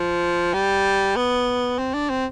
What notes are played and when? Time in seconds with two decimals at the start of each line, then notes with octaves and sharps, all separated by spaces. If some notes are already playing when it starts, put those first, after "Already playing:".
Already playing: F3
0.54 G3
1.16 B3
1.78 C4
1.94 D4
2.09 C4